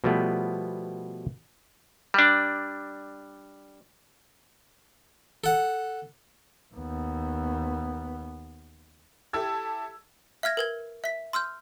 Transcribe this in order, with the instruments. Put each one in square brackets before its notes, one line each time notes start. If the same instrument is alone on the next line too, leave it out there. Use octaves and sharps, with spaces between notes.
[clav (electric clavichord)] B2 F3 G3 A3 B3
G3 D4
[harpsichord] A4 F#5
[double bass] D#2 B3
[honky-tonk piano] E4 G4 A4 A5 E6 G#6
[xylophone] E5 F5 F6 G#6 A#6
A#4 B4 G#6
E5 B6
C6 E6 F6 G6